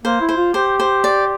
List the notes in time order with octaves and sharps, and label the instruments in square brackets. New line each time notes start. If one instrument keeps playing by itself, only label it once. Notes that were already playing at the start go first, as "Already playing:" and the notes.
[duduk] A#3 [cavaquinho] C5
[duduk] E4
[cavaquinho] C5
[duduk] F4
[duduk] G4 [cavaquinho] C5
[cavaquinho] C5
D5